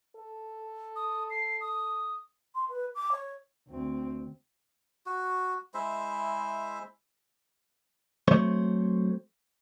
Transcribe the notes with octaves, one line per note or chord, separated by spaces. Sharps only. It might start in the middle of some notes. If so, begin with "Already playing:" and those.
A4
D#6
C7
D#6
C6
B4
D6
C#5
D2 C4
F#4
G#3 E4 C5 E5
F#3 A3 C4 C5 C#5